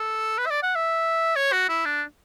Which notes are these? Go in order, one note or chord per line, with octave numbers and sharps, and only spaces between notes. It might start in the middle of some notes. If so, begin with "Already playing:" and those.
Already playing: A4
B4
E5
D5
F#5
E5
C#5
F#4
E4
D4